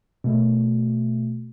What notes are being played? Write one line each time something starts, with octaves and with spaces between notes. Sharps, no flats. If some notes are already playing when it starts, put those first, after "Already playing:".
B2 A3